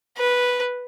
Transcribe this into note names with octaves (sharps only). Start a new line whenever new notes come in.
B4